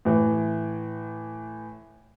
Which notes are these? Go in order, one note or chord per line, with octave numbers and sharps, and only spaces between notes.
A2 E3